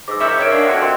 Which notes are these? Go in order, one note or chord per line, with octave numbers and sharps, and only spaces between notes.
G#2 D6 E6
A#2 C#4 E5 C#6 D6 G6
D#3 C#5 G#6 D7
F3 A#3 D4
F2 A#2 F#4
C4 C6